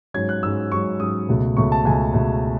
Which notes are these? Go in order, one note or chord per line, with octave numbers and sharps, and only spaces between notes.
G#2 F#3 C#4 G#6
F#6
G#2 F#3 C#4 E6
G#2 F#3 C#4 C#6
G#2 F#3 C#4 D#6
C#2 B2 A3
C#2 B2 A3 C#6
A5
C#2 B2 A3 G#5
C#2 B2 A3